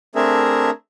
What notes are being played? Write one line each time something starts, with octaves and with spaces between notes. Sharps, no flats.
A3 C4 D4 G#4 A#4 E5